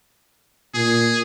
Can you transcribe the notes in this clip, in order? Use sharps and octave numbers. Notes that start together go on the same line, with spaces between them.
A#2 G#4